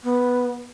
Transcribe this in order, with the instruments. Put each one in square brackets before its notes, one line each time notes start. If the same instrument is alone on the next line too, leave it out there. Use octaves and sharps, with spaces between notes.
[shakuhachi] B3